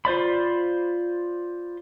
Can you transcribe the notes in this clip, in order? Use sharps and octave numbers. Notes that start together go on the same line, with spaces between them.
F4 C5 D5 B5